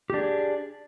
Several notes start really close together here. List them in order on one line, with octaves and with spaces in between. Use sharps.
G4 D4 G#4